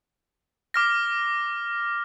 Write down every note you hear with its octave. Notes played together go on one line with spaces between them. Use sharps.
D6 F6 A#6